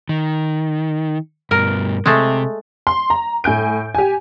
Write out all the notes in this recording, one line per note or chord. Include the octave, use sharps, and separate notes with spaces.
D#3
G2 B2 A#4
C3 G#3 A3
C6
A#5
A2 G#5 G6 D7
G4 G#5